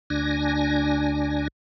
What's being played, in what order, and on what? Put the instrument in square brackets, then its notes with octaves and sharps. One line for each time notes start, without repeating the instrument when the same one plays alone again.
[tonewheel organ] D2 D4 G#5 A#6